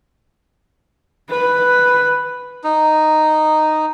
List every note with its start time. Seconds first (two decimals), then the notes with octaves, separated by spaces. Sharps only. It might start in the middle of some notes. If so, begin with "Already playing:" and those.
1.30 B4
2.64 D#4